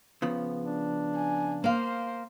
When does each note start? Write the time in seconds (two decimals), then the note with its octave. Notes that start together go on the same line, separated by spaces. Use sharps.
0.22 C#3 F3 B3
0.62 D4
1.15 G#5
1.64 A#3 C5 F5